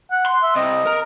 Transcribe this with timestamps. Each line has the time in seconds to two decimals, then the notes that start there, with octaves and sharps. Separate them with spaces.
0.11 F#5
0.26 C6
0.43 E5
0.56 C2 C3 D#5
0.86 A#4 A#5